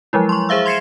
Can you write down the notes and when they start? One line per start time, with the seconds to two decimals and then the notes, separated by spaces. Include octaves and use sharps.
0.13 F3 F#3 G#3 E4
0.29 C6 C#6
0.49 G#4 C5 E5 F5 E6
0.66 C6 G#6 C7 C#7 E7